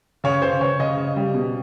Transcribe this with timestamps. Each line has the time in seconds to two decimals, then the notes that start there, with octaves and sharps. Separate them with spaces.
0.24 C#3 C#5
0.42 C#3 C5
0.61 C#3 C#5
0.79 C#3 D#5
0.97 C#3
1.16 G3
1.34 B2